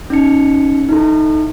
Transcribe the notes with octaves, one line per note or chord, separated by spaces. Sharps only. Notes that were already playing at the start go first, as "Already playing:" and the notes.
C#4 D#4 C#7
D#4 E4 A4